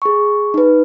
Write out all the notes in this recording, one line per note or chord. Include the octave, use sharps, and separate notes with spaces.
G#4 C#6
D#4 B4